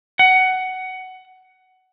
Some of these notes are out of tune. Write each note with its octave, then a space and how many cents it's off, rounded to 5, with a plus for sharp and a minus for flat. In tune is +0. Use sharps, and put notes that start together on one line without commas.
F#5 +15